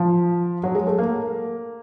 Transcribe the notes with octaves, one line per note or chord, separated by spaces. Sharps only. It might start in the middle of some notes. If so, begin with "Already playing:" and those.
Already playing: F3
F#3
G#3
A3
A#3